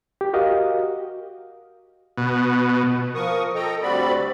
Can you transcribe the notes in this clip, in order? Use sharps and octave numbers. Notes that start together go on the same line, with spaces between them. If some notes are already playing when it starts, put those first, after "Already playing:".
G4
F#4 G4 A#4 D#5 F5
B2
F3 A#4 C#6 D#6
A4 D#5 G5 A#5
D2 G3 C4 F#4 D5 B5